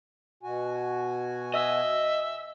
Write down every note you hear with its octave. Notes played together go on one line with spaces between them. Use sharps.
B2 F#4 G#5
D#5 E5